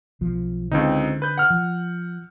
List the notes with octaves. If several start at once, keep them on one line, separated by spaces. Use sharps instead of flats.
B1 F3
C#2 D3 C4 D#4
B4 G6
F#5 F6
F3